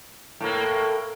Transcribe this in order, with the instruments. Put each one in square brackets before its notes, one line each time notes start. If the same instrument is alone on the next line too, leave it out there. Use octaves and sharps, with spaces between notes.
[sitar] A2 A#3